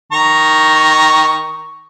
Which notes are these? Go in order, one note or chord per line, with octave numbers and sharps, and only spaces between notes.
D#3 A#5 C#6